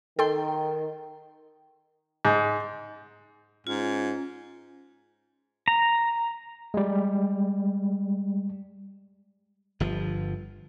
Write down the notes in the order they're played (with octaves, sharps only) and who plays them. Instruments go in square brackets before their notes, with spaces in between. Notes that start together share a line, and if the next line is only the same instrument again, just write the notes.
[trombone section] D#3 [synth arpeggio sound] A4 G5 C6
[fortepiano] G#2
[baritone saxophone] G#2 [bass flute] C#4 [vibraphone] F4
[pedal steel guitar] A#5
[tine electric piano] G3 G#3
[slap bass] G1 F3